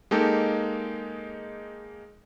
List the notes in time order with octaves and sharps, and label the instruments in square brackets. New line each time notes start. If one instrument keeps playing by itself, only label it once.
[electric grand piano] G#3 A#3 D#4 G4 A4